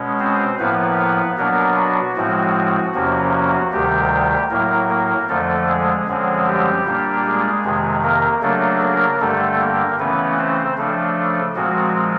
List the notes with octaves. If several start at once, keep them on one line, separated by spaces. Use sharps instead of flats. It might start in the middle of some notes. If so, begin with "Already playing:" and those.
Already playing: B2 G#3 C#4
C4 C5
A2 F3 A#3 B3 B4
B2 F#3 A#3 B3 D4 A#4
F#4
A2 F3 G#3 C4 F#4
E2 C3 F3 A#3 C#4
F#4
D2 C3 D#3 G3 G4
A2 F#3 A#3 A#4
A#3 A#4
F2 D3 F3 A3 A4
G#3 G#4
F#2 D3 F3 G#3 C4
G3 G4
A#2 G3 A#3 D4
G#3 G#4
F2 C3 D#3
A#3 A#4
C#3 F#3 A3 A#3 D4 A4
A#3 A#4
G2 D3 G3 A3 A4
A#3 A#4
C#3 E3 A3 B3 C#4 B4
C4 C5
C#3 F3 A3 D4 A4
A#2 F3 G#3 C4 F#4